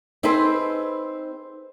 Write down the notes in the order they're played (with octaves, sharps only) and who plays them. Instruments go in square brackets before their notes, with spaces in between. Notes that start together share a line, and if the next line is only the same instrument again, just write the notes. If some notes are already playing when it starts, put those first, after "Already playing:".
[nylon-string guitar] C4 D#4 G#4 A4 B4 C5